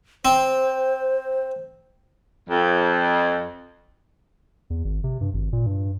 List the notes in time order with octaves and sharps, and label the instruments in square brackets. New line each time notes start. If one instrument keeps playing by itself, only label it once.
[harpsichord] C4 [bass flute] C5
[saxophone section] F2
[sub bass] E2
G#1
C3
G2
G#1
A#2
G2